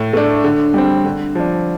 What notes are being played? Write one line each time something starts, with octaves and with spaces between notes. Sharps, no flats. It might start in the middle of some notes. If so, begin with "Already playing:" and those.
Already playing: A2
A3 D4
D3
G3 C4
D3
F3 D4